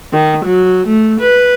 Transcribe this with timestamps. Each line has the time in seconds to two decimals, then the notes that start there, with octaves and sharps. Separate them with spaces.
0.13 D#3
0.44 F#3
0.87 A3
1.20 B4